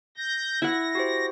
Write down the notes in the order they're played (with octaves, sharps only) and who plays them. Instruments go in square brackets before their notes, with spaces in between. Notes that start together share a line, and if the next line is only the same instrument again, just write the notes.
[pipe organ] G6 A#6
[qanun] E4 F#5 [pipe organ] A#6
[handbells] F#4 G4 C5